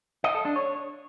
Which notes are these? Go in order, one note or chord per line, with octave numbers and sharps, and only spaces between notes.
D#5
A4
D4
C#5